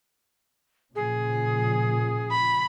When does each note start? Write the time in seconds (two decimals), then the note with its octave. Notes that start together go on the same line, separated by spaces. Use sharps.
0.96 A#2 C#3 F3 G#4
2.30 B5